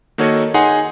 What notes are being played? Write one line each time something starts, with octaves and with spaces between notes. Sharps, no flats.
D#3 A#3 F#4 A4 C#5 D#5
D#4 G#4 F#5 G#5 C6